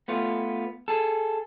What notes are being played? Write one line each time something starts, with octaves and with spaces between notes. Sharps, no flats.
A3 B3 F4
G#4 A4